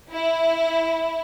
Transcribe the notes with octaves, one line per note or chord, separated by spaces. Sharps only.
E4